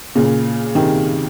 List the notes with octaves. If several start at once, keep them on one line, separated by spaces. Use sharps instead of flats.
A#2 C#3
C3 D#3